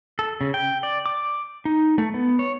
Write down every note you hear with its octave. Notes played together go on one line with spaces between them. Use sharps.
A4
C#3
G5
D5
D6
D#4
A3
B3
C#5